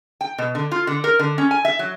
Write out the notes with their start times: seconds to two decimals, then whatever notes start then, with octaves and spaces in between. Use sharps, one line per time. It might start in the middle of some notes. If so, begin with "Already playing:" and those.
0.21 G5
0.38 B2
0.55 D3
0.71 F4
0.87 D3
1.04 A#4
1.19 D3
1.38 C#4
1.51 G#5
1.65 E5
1.79 F#3